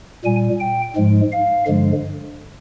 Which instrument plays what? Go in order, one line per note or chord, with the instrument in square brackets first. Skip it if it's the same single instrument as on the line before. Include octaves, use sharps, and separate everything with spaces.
[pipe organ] A#2 G3 G#5
G5
G#2 F3 G#3
F5
G2 D3 F3 G#3